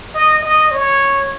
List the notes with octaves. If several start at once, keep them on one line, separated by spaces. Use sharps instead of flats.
D#5
D#5
C#5